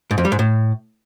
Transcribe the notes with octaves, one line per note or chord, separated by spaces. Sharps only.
G#2
F2
G3
G#2
A2